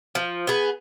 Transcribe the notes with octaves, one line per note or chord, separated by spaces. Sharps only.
F3
B3 G#4